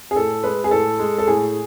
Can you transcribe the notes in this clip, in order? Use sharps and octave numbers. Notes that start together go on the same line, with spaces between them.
G#4
A2 A4
G#3 B4
G#4
A2 A4
G#3
A4
A2 G#4